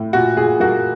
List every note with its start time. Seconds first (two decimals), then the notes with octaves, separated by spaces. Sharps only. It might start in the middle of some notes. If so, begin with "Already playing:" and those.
Already playing: A2
0.13 A#2 F#4
0.37 A#2 G#4
0.60 A#3 F#4